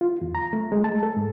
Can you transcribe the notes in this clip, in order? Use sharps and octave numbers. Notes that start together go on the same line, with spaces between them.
F4
E2
A#5
A3
G#3
A5
A4
G#2